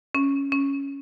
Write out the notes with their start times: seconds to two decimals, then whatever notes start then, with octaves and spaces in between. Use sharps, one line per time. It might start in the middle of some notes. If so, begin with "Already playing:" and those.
0.15 C#4
0.52 C#4